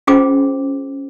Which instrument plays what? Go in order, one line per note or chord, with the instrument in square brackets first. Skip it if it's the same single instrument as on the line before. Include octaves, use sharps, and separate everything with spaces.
[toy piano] C#4 F4 G#4 C5 G5 D6